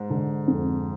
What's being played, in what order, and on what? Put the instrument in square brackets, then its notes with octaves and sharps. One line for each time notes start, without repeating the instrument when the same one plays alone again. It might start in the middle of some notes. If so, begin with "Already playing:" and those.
Already playing: [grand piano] G#2
[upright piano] D3
F2